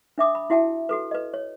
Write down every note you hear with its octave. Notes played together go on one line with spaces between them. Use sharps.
D4 E5 D6 D#6
B5
E4 F#4 E5 G5 A5
F#4 A4 B4
B4 D#5
C#5